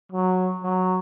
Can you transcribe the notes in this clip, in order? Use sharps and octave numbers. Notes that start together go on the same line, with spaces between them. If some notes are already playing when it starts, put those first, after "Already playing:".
F#3
F#3